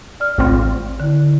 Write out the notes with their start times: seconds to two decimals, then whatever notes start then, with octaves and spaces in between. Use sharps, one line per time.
0.20 D5 F6
0.38 A1 C4 F4
1.00 D3 E4